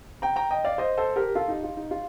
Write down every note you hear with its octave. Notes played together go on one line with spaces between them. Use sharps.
G5 A#5
G5 A#5
D#5 G5
D5 F5
C5 D#5
A4 C5
G4 A#4
F4 A4
D#4 G4
F4
D#4
F4